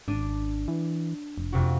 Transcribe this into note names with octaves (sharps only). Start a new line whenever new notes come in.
G#1 D4 D#7
E3
F1
F2 C3 F#4